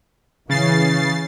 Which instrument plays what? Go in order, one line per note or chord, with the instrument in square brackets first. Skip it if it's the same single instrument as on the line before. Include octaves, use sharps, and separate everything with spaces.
[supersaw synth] C#3 A6 C7 [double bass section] E3